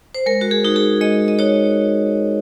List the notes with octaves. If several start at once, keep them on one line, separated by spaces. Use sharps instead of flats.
C5
G#3 A#4
F#4
G#4
D#4 F#4
G#4
G#3 D#5
D#5
D#4 F#4 C#5